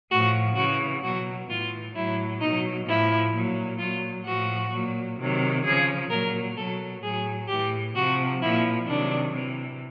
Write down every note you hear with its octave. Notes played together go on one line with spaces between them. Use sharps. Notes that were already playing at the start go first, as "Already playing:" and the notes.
A2 F3 F#4
C#3 E3 F#4
B2 F#3 F#4
A2 E3 F4
A2 F#3 E4
B2 F#3 D#4
A2 F3 E4
A#2 F#3
A#2 F#3 F4
A2 F3 F#4
A#2 F#3
C3 D#3 F#3
C#3 F3 G#4
A#2 F#3 A#4
B2 F#3 A4
A2 F#3 G#4
A2 E3 G4
C3 F3 F#4
A#2 F3 E4
C3 D#3 F#3 D4
C3 E3